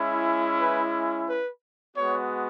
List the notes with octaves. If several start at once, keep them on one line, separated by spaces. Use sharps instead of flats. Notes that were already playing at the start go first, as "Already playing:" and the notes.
Already playing: G#3 C#4 E4
B4
B4
G#3 B3 F#4 C#5